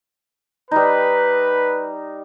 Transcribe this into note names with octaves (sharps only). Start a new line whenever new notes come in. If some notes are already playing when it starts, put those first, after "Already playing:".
G3 D#4 B4